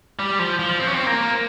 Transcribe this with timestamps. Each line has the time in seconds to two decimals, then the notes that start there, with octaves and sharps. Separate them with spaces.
0.19 G3
0.39 F3
0.59 F3
0.80 C4
0.87 C#4
0.94 C4
1.06 A#3